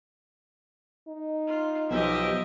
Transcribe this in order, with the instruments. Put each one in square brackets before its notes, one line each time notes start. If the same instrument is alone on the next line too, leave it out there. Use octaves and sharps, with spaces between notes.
[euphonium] D#4
[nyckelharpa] F4
[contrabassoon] B1 [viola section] F3 G4 [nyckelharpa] D#5 E5